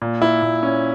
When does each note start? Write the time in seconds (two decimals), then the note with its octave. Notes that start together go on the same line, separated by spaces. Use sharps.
0.02 A#2
0.22 E4
0.42 A#2
0.63 C#4